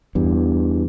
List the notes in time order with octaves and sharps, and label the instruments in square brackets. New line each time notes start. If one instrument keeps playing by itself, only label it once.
[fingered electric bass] E2 G2